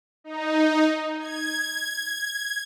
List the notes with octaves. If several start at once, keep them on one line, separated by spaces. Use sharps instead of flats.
D#4
G#6